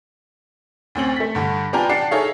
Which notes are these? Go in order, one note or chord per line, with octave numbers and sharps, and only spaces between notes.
D2 C4 C#4 F#7
A3 B6
G2 D3
B3 D4 F4 G4 G#5 A#5
D4 G4 F#5 A5 C7 C#7
D#4 G#4 A4 C#5 E5 F5